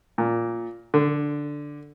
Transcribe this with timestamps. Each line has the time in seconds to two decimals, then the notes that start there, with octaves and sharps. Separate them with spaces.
0.18 A#2
0.94 D3